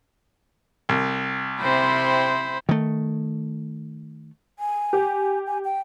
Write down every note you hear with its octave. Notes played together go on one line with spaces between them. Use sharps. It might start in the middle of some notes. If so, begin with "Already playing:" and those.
C2
C3 C4 E4 C5 B5
D#3 A3
G#5
G4
G#5
G5